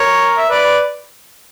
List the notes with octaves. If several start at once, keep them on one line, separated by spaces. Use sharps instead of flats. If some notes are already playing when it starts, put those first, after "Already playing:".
Already playing: A#4 C#5
E5
B4 D5